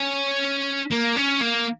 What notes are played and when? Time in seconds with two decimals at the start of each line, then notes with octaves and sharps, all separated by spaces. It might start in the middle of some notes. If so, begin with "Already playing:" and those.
Already playing: C#4
0.92 A#3
1.17 C#4
1.42 A#3